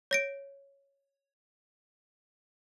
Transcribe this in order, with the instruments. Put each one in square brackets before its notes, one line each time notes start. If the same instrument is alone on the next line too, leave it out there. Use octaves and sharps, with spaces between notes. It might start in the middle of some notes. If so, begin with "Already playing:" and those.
[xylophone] C#5 A#6 D7